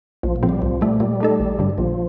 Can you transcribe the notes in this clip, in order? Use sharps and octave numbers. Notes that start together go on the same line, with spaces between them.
A#1 F3
A#2
A2 F3 C4
G3
C2 F3
A#2 G3 A3
A#2 G3
A3 D#4 A4
A1
G2 D3
A#1 F3